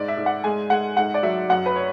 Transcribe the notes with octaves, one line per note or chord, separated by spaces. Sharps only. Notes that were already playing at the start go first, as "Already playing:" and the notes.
Already playing: G#2 D5
E5
G#2
F#5
G#3 G#5
G#3 F#5
G#2 F#5
D5
F#3 E5
F#2 F#5
B4
C#5